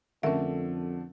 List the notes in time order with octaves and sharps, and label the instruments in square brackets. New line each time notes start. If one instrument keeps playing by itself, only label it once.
[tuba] F2 [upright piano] D3 A3 [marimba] C#4 A#4 [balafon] E5